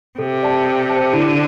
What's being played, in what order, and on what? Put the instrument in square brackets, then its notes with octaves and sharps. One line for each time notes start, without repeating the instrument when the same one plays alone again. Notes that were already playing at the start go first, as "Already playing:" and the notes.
[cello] C3 [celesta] A4
[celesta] D5 A5
A4
C5 A5
[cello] D3 [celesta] E4